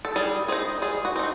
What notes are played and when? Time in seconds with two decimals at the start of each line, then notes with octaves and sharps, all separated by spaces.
0.05 A4
0.16 G3 G#4
0.48 C4 D#4 G#4
0.82 G3 G#4
1.05 F#4
1.16 C4 D#4